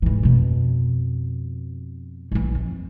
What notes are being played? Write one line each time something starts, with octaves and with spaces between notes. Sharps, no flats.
G#2 E3
F2 B2
A#1 E3
F2